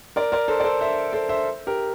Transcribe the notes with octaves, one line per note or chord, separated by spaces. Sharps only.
A#4 D5
A#4 D5
A4 C5
D5
A4 C5
C5 E5
A4 C5
C5 E5
G4 A#4